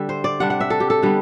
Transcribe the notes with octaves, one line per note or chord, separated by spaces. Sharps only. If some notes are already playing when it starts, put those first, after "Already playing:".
Already playing: D3 G3 E5
C5
D5
C3 G3 D4 F#5
F#5
E5
A4
G4
A4
D3 G3 B3